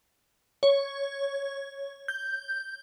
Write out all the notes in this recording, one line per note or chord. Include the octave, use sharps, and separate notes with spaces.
C#5
G6